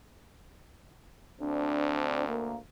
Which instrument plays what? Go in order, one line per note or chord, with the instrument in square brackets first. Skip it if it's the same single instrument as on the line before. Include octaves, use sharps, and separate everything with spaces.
[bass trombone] D2 [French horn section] C4 D4
[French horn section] A#3